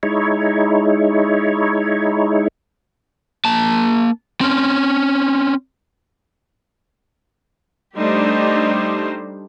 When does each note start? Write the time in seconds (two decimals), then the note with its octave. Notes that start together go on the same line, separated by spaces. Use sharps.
0.03 G#3 D#4 E4 C#5
3.45 A#3 A5
4.41 C4 C#4
7.97 G3 A3 D4 D#4 G4 C5